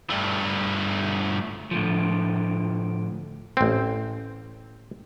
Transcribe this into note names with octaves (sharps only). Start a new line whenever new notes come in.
G2 A3
A2 D3 F3
A1 C4